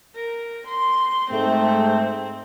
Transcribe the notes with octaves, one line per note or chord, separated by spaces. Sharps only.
A#4
C6
G#2 A3 C4